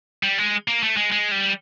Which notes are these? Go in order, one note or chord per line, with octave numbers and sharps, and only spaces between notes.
G3
G#3
A#3
A3
G#3
G#3
G3